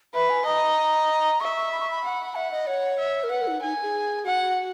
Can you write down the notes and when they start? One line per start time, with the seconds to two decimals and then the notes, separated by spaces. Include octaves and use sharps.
0.14 B4 E5
0.30 G#5
0.45 D#5 A#5
1.40 E5 C#6
1.56 C#6
1.72 B5
1.81 C#6
1.91 B5
2.04 F#5
2.35 E5 F#5
2.51 D#5
2.67 C#5 F#5
2.99 E5
3.24 A#4
3.30 B4 F#5
3.41 A#4
3.47 E4
3.51 D#4
3.62 D#4 G#5
3.83 G#4
4.25 F#4 F#5